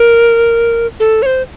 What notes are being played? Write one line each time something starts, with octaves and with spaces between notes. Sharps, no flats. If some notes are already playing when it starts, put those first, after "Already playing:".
Already playing: A#4
A4
C#5
C5